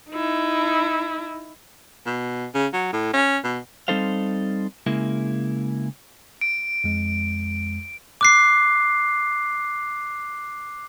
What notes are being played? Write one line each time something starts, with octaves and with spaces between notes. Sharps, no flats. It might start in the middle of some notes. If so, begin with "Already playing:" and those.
D#4 E4
B2
C#3
F#3
A2
C#4
B2
G3 C4 D#4 A4 C5 F5
C#3 G#3 A#3 E4
D7
F2 G#3
D6 F#6 C7